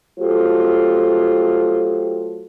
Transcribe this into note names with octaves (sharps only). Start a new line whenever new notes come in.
F#3 A3 F4 G4 A4 C5